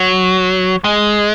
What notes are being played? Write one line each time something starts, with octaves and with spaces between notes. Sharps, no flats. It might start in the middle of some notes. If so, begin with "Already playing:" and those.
Already playing: F#3
G#3